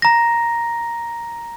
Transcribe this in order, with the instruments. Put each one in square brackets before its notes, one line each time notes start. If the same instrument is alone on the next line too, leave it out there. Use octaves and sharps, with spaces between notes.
[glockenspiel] A#5 A#6